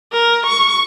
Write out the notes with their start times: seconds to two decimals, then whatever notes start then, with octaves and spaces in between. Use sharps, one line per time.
0.12 A#4
0.47 C#6